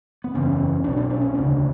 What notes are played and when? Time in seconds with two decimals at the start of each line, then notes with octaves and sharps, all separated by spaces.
0.24 B3
0.34 F#1 E2 C#3 C#4
0.84 B1 D4
0.89 B2
0.97 D4
1.09 C#4
1.21 C#4
1.33 E1 D2 C#3 D4